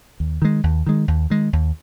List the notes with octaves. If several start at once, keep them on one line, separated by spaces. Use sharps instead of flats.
D#2
D#3 G#3
D#2
D#3 G#3
D#2
D#3 G#3
D#2